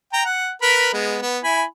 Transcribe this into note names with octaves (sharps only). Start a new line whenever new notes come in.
G5 A#5
F#5
A#4 B4 B5
G#3 B3
B3
E4 G#5 B5